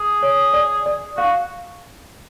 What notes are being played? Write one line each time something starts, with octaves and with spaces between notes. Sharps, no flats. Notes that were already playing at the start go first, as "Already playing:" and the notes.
Already playing: G#4
C#5
D5
D5
F#4 F5